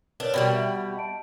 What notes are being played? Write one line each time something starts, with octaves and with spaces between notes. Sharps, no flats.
D4 A#4 B4 C#5
B2 D#3 G3 D5 G5
E5 F#5
D#5 A5 D7